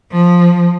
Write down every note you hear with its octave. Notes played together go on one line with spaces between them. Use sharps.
F3